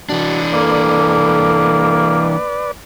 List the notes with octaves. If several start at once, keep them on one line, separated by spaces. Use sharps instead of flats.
E3 D4 F#4
A#3 A4 B4 D5